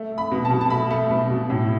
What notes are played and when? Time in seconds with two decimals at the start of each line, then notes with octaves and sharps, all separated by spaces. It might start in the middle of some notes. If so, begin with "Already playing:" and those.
Already playing: A3
0.12 A3
0.18 B5
0.31 B2
0.45 A5
0.50 B2
0.61 A5
0.70 A3 B5
0.91 A3
1.11 B2
1.30 B2
1.50 A2